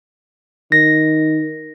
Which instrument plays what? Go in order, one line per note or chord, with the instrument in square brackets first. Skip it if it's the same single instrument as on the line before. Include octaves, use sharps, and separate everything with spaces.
[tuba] D#3 [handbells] A#6